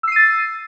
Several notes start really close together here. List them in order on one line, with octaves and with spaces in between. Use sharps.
E6 C7 D#7 A6